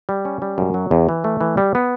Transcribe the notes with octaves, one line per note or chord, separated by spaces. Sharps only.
G3
C#4
G3
F#2
F#3
E2
E3
A3
E3
G3
B3